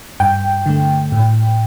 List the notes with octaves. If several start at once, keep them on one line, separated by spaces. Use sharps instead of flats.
G2 G5
D3 A3
A2